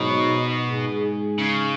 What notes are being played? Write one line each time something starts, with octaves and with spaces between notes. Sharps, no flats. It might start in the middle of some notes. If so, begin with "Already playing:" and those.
Already playing: G#2 B2 F#3 D#4
G#2 G#3 D#4 G#4
C#3